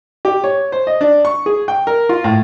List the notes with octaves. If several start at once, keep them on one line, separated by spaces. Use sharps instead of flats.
G4
C#5
C5
D#5
D4
C#6
G#4
G5
A#4
F4
A2